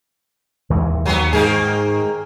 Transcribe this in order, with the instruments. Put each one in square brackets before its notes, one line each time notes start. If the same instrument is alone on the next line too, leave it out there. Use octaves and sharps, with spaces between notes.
[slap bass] D#2 E3 G#3
[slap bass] D#2 [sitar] F#3 B3
[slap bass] G#2 [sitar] D#3 A#3 G#4